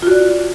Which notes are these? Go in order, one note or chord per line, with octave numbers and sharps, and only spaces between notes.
F4 F#4 D5